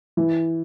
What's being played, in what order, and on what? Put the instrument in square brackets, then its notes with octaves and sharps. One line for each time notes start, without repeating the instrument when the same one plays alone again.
[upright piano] E3